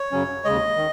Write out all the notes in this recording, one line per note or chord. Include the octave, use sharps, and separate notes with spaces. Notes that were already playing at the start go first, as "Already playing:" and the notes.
Already playing: C#5
F#2 C#3 F#3 C#4
D#2 C#3 G#3 D#5
D#3